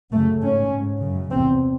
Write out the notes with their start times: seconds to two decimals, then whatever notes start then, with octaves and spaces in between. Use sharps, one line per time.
0.12 F#2 C#3 A3
0.41 G#2 C#4
0.72 G#2
1.02 F#2 C#3
1.31 E2 C3 C4